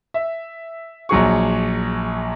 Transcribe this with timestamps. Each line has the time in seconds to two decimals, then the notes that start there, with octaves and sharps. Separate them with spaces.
0.14 E5
1.09 A#1 F#3 G#4 C#6